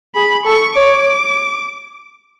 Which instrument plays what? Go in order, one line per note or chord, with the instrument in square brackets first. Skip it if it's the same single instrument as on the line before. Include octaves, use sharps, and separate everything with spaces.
[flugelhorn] G#4 [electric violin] B5
[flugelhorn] A4 [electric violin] C#6
[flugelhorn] C#5 [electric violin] D6